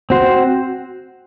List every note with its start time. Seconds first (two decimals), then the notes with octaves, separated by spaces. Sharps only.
0.10 C4 F#4 C5